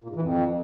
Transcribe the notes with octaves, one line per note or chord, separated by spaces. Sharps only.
A#2
G#2
E3
F2